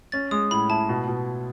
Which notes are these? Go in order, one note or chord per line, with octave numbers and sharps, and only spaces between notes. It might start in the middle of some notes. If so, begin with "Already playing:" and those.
C#4 A6
G#3 D#6
A2 B5
E4 A5
B2
B2